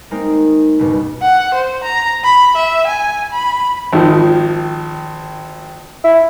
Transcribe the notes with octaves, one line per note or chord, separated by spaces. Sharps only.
G#3 A#3 C4 D#4
C#2 G2 B2
F#5
C5
A#5
B5
E5
G#5
B5
G#1 D#3 F3
E4